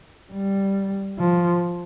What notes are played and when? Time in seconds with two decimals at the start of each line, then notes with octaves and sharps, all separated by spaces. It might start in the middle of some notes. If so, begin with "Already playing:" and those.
0.33 G3
1.19 F3